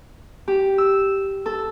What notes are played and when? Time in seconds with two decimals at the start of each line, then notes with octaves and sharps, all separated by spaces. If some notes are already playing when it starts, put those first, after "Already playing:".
0.48 G4
0.78 E6
1.46 A4